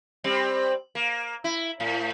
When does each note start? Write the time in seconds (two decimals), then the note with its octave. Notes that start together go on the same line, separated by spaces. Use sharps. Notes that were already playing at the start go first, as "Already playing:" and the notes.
0.24 G3 C4
0.95 A#3
1.44 E4
1.80 A2